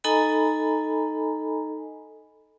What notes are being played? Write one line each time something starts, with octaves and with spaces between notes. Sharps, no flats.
D#4 A4 D#5 G#5 A#5 B5